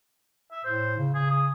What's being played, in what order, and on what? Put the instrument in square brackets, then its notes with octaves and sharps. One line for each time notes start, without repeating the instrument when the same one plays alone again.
[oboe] E5
[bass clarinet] A2 [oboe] C5
[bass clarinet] C#3
[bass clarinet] C#3 [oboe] G#4
[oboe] D#6